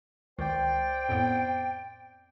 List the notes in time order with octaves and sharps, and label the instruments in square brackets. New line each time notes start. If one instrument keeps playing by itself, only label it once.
[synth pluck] C#2 D#3 [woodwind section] C5 D5 G5
[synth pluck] F2 A2 B3